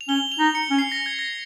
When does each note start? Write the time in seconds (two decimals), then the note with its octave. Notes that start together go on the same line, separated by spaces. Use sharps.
0.01 F7
0.08 C#4 G7
0.32 F7
0.39 D#4
0.55 C#7
0.70 C#4
0.78 C7
0.92 A#6
1.06 G#6
1.19 A#6